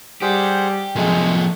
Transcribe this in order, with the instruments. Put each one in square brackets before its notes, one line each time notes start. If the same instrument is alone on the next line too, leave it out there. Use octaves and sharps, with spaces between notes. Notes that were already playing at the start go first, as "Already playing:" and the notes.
[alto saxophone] G3 [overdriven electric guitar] G4 [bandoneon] G#4 C5 F#5
[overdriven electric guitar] F#2 C3 [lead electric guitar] F3 G#4 [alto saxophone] G#3 [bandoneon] A3